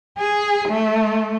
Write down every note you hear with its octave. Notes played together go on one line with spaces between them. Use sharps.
G#4
A3